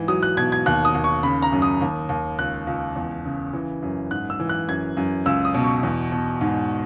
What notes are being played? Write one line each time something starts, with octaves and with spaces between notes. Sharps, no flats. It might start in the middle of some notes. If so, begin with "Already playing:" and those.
Already playing: G#2 E3
F#3 D#6
F#6
B2 G#6
G#6
D#2 F#6
D#6
D#2
C#6
C#3 B5
A#5
F#2
D#6
D#2
D#2
C#2 F#6
C#2
E2
C#3
E3
F#2
G#2 F#6
E6
E3
F#6
F#2 G#6
F#2
C#2 E6
D#6
B2
C#6
E2
B2
G#2